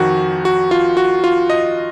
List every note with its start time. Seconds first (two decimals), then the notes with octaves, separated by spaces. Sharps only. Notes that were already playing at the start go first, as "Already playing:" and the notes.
Already playing: F2 D#3 F#4
0.45 F#4
0.71 F4
0.97 F#4
1.24 F4
1.50 D#5